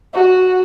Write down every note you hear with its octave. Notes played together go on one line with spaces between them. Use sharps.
F#4